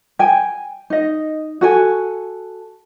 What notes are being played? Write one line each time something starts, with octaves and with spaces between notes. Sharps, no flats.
G5 G#5
D#4 D#5
F#4 A4 G#5